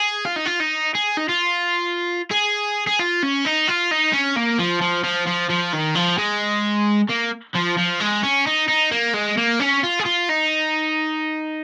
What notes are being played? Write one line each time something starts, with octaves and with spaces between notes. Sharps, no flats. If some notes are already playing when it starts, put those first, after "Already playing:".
Already playing: G#4
F4
D#4
F4
D#4
G#4
D#4
F4
G#4
G#4
F4
C#4
D#4
F4
D#4
C#4
A#3
F3
F3
F3
F3
F3
D#3
F3
G#3
A#3
F3
F3
G#3
C#4
D#4
D#4
A#3
G#3
A#3
C#4
F4
G#4
F4
D#4